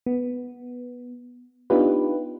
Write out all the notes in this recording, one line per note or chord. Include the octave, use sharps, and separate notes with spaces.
B3
B3 D4 D#4 F4 G4 B4